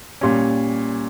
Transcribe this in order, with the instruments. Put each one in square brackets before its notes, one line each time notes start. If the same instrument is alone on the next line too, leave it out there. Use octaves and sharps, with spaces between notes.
[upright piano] A#2 G3 C#4